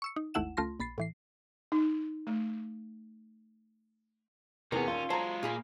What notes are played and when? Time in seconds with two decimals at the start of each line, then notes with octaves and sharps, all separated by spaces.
0.02 C#6 E6 C#7
0.16 D#4
0.34 G#1 D#2 A3 E4 F#5 E7
0.57 C#2 A3 F4 C6 A#6
0.80 A#1 B5 A6 C7
0.98 A2 E3 C7
1.72 D#4
2.27 A3
4.72 E2 C3 E3 B3 C#4 G#4 A#4
4.88 D#2 A#2 F4
5.10 F#3 G#3 C5 A5 A#5
5.43 A#2 A#3 G#4 F5 B5